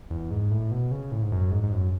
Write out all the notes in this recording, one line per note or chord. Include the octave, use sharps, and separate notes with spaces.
E2
G#2
A2
B2
C#3
A2
G#2
F#2
G#2
G#2
F#2